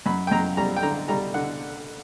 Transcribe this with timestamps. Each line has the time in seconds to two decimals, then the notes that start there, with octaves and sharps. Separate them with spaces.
0.06 F#2 B5
0.27 G5
0.31 F#2 A#5
0.57 G3 A#5
0.76 G5
0.83 D3 A#5
1.08 G3 A#5
1.34 D3 F#5